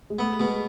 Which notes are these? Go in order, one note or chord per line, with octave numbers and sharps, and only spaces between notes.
G#3
A3 B3
B2 G#3